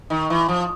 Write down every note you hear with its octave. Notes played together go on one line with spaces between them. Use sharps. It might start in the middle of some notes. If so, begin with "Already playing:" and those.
D#3
E3
F3